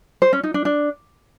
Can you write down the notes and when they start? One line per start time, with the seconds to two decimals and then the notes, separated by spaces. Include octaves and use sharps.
0.22 C5
0.33 C#4
0.43 D#4
0.54 D4
0.65 D4